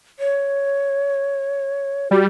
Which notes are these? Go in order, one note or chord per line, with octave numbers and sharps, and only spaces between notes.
C#5
G3 F#4